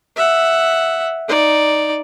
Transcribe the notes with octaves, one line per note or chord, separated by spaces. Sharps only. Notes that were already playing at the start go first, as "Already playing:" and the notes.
E5 F#5
D#4 D5